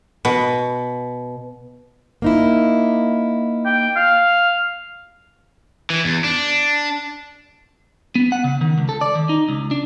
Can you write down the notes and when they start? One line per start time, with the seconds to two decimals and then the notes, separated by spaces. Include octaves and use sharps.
0.25 B2
2.22 A#3 D#4 E4
3.66 G5
3.96 F5
5.90 E3
6.05 E2
6.24 D4
8.15 B3
8.32 F#5
8.44 C#3
8.61 D#3
8.78 C#2
8.89 A4
9.01 D5
9.15 D#3
9.29 D#4
9.49 C#2
9.71 D4